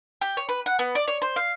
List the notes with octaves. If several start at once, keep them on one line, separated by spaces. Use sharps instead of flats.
G4
C#5
B4
F#5
B3
D5
C#5
C5
F5